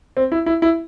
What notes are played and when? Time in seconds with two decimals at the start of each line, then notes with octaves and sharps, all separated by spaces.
0.17 C4
0.32 E4
0.46 E4
0.62 E4